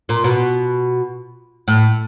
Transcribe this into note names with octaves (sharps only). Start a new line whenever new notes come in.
A#2
B2
A2